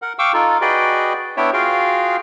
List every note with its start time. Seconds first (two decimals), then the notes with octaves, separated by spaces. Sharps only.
0.02 A#4 F#5
0.19 F5 G5 C#6 D6 E6
0.33 D#4 F4 A4
0.61 F#4 G#4 B4 D5 D#5 G5
1.37 B3 D4 E4 C#5 E5 G5
1.53 F4 F#4 G#4 F5 G5